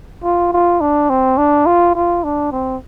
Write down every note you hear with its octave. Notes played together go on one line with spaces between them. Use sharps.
F4
F4
D4
C4
D4
F4
F4
D4
C4